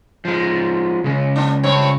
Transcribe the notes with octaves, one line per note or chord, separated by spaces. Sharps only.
F3 G#3
C#3 G#3
A#3 D4
G2 C4 C#5